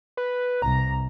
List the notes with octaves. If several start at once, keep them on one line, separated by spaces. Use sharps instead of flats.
B4
C2 A#5